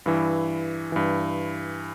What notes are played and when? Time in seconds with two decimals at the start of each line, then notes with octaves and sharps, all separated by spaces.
0.06 G2 E3
0.92 G2 E3